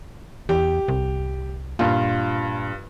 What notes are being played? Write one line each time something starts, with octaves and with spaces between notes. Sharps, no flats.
E2 G4
C2
G2 A#2 F4